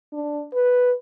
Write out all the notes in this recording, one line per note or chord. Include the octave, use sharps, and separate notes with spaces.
D4
B4